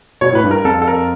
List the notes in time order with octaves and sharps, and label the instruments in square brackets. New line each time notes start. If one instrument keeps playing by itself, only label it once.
[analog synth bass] B2 [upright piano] C#5
[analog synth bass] A2 [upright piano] B4
[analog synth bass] G2
[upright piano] A#4
[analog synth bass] F2 [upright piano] A4
[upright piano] A4
A#4